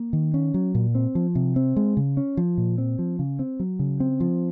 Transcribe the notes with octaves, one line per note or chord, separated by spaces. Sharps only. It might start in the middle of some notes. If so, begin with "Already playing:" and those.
Already playing: A#3
D#3
C#4
F#3
A#2
C4
F3
C3
C4
G#3
C#3
C#4
F3
A#2
C4
F3
C#3
C4
F#3
C#3
C4
F3